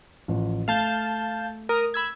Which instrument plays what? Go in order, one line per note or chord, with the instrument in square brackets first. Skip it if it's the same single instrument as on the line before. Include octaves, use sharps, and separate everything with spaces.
[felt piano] A1 F3
[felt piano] A3 [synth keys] F5 A5 G6
[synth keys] A#4 D#6
B5 E6 G#6